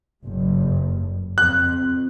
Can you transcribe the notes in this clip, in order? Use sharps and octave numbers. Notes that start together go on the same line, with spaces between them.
F#1 G2
F2 C4 F#6